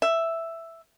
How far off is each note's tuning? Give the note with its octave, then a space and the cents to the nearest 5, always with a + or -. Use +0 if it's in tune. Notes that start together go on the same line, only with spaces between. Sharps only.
E5 +5